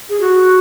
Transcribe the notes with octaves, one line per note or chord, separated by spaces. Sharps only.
G#4
F#4